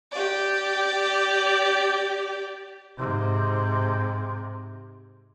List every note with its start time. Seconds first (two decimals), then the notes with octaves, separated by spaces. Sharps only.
0.12 G4 D5
2.96 G#2 C3